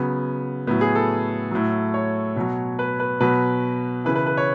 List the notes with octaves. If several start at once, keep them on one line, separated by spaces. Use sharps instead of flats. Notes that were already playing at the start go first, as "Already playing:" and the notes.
Already playing: C#3 F#3 B3
A2 F#3 B3
G#4
A4
A2 F#3
C#5
B2 F#3
B4
B4
B2 F#3 B4
C#3 E3 B4
B4
B4
C#5